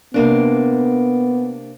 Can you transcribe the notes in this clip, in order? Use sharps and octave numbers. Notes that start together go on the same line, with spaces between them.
C3 A#3 B3 D4